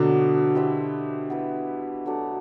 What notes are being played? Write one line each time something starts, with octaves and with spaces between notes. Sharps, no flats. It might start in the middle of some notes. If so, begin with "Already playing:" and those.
Already playing: B2 D3 F#3 B3 D4 F#4
E4 G4 C5 E5
B3 E4 B4
F#3 A3 D4 A4